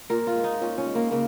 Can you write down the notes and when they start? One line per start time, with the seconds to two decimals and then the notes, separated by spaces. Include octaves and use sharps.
0.10 A#2 A#4
0.27 F4
0.35 G#3
0.44 D#4
0.61 A#2 C#4
0.78 C#4
0.86 G#3
0.95 A#3
1.11 C#3 A#3